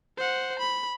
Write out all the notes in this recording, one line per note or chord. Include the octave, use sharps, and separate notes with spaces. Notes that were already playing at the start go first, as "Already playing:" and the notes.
C5 F#5
B5